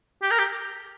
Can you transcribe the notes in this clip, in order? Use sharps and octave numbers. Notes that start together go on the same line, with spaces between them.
G4
A#4
G4